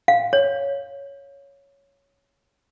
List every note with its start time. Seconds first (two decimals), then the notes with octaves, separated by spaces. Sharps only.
0.08 F5
0.33 C#5